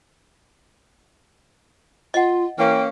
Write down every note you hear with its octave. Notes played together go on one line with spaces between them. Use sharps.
F4 D#5 F#5
E3 A#3 C#4 G5